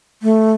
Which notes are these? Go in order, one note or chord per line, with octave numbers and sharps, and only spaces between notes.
A3